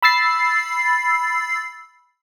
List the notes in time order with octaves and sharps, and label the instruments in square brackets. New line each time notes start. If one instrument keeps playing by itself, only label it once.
[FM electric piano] B5 E6 A6 C7